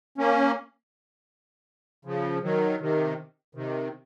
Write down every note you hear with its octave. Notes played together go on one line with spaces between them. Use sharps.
A#3 C#4
C#3 F3
D#3 F#3
C3 D#3
C3 D#3